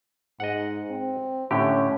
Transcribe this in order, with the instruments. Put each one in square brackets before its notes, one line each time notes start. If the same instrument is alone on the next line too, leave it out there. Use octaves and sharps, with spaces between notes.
[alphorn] G#2 [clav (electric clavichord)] D#5 F#5
[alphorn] C4
[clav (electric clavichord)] A2 D3 G4 [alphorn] C#4